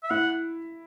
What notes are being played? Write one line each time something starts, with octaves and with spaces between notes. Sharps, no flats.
E5
E4 F#5